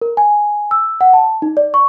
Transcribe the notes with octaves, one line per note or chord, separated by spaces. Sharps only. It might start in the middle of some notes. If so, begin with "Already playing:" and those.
A#4
G#5
E6
F#5
A5
D#4
D5
C#6